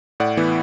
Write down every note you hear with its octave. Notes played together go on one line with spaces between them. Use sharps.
A2 D5 F#5
E3 B3 E4